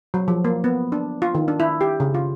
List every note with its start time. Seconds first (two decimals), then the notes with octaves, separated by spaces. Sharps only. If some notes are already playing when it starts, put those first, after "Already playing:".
0.14 F#3
0.28 F3
0.45 A#3
0.64 B3
0.92 D4
1.22 F4
1.35 D#3
1.48 D4
1.60 E4
1.81 G4
2.00 C#3
2.15 F4